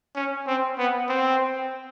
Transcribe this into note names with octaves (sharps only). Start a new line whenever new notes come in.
C#4
C4
B3
C4